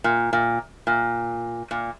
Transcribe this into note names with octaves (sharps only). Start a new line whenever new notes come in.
A#2
A#2
A#2
A#2